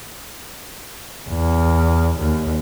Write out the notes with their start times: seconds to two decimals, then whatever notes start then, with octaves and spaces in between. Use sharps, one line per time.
1.29 E2
2.18 D#2